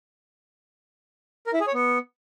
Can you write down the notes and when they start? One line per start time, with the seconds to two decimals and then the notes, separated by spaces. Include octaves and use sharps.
1.47 A#4
1.54 E4
1.60 G#4
1.67 C#5
1.74 B3